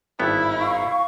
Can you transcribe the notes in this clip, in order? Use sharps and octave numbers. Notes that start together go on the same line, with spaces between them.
G#1 G2 B3 E4
F5 C#6